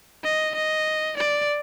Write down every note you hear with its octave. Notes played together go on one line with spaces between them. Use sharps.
D#5
D#5
D5